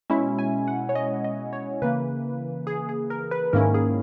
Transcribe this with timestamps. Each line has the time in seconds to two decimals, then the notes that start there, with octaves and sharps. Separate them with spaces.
0.10 B2 G#3 C#4 E4 E5
0.39 G#5
0.68 F#5
0.89 C#5
0.95 D#5
1.24 D#5
1.53 C#5
1.82 C#3 E3 A#3 B4
2.67 G#4
2.89 G#4
3.10 A#4
3.31 B4
3.53 G#2 D#3 A#3 C#4 E4 A#4
3.74 G#4